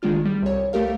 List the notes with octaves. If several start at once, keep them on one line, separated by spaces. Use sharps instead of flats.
G#1 D#3 G#3 D4 F4 F6
G3
C2 C#5
C2 A3 G4 A#4 F5